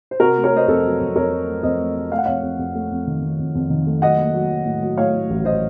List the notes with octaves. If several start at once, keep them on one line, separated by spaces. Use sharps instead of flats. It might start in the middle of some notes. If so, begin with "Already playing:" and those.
C5
C3 F#4 A#4
A3
A#4 C#5
A3 C5 D#5
F2 A4 C5
F#3
F2
F2 A#4 C#5
F#3
A3
F2 C5 D#5
A3
A3
A3 F5
F#5
F2 C#5 F5
F2
F2
A3
F2
D#3
D#3
F2
F2
D#3
A3
F#3 D#5 F#5
A#3
F#3
F#3
A2
F#3
A2 C#5 F5
A2
A1
C5 D#5